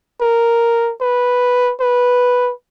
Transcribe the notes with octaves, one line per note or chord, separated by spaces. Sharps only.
A#4
B4
B4